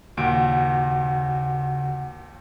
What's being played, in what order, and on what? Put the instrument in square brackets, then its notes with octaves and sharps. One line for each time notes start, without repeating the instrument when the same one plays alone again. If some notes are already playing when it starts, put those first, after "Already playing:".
[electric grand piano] D#2 A#2 D7 [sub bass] C#3 [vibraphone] F#4 F#5